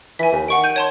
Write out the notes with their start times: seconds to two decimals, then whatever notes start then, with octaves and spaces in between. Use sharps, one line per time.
0.19 E3 G#5 B6
0.33 D#2
0.48 D#3 F#5 C#6 D7
0.64 G6 D#7
0.76 C#5 A5 C6